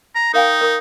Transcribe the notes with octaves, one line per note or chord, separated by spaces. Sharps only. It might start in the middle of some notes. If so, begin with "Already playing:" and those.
A#5
D#4 A#4 F5 G5
A#4 D#6